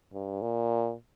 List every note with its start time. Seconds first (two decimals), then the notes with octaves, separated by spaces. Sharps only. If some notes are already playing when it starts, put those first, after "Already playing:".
0.13 G2
0.42 A#2